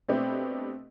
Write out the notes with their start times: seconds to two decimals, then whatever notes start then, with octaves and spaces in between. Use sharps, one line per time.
0.08 B2 A3 C4 D4 G4 B4